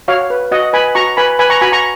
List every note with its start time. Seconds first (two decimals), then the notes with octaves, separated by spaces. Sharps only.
0.08 F#4 C#5 F5
0.30 B4
0.52 F#4 D#5 F#5
0.73 B4 G#5 B5
0.95 F#4 A#5 C#6
1.17 B4 G#5 B5
1.39 B4 G#5 B5
1.50 A#5 C#6
1.61 F#4 G#5 B5
1.72 A#5 C#6